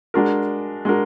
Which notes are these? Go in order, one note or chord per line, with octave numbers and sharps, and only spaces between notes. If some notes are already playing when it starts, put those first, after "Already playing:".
G#3 D4 F#4 A#4
G#3 D4 F#4 A#4